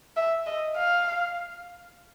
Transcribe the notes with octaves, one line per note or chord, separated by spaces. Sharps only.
E5
D#5
F5